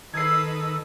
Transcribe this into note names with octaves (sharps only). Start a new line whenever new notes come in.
D#3 A4 B4 D#6 E6 G#6 C7